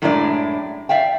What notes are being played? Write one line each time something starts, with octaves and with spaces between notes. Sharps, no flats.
F#2 A2 G#3 D4 E4 D5
D5 E5 F5 G5